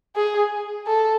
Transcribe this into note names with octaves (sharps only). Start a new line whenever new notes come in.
G#4
A4